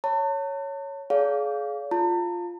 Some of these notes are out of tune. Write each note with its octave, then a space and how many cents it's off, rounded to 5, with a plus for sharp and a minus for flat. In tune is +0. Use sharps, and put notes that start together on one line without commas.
C#5 +0 A5 +40
G#4 +30 D5 -45 F5 +0
F4 +0 A5 +40